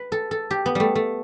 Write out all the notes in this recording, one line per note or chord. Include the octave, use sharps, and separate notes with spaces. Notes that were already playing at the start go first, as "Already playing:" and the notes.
Already playing: B4
A4
A4
G4
B3
G3 A3
A3